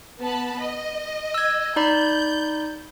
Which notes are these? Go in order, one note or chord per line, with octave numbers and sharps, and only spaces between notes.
B3 A5 B5
D#5
E6 G#6
D#4 D5 B5 G6